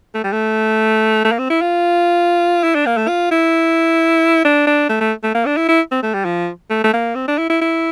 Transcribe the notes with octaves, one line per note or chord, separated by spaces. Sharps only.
A3
G3
A3
A3
A#3
C4
E4
F4
E4
D4
A#3
A3
F4
E4
D4
D4
A3
A3
A3
A#3
D4
E4
E4
C4
A3
G3
F3
A3
A3
A#3
C4
D4
E4
E4
E4